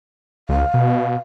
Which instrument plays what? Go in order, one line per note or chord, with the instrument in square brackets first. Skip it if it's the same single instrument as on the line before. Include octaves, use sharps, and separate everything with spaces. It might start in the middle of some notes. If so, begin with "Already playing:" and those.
[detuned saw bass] C#2 [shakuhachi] F5
[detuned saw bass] B2